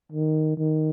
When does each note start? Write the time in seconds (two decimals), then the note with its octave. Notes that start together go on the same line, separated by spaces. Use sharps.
0.12 D#3
0.57 D#3